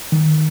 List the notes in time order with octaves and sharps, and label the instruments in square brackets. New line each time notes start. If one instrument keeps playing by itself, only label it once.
[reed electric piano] D#3